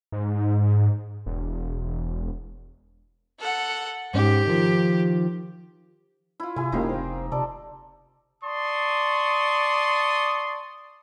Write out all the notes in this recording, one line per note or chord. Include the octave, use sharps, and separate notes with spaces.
G#2
E1
A4 F#5
G#2 C#4 G4
D#3 F3
E4 F4
C3 E4 G#4 G#5
F1 C#3 A#3 C#4 D#4 F4 G4
C4 C5
C3 A4 D5
D5 A5 C6 C#6 D#6